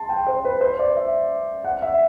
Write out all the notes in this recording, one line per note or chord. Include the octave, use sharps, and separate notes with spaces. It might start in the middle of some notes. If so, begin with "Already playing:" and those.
Already playing: A5 C6
G5
C5
B4
C5
D5
E5
F#5
E5